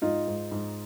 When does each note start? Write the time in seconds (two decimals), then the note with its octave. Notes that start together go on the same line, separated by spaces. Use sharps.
0.02 G#2 D#4 F4
0.27 G#2
0.52 G#2